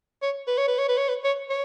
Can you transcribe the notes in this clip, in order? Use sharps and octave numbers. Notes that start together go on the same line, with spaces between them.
C#5
B4
C#5
B4
C#5
B4
C#5
B4
C#5
C#5